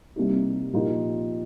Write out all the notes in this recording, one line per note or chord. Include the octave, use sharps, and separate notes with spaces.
C2 C3 G3 A#3 D#4
A#2 F3 D#4 G4 A#4